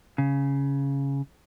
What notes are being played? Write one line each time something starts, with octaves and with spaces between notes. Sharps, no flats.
C#3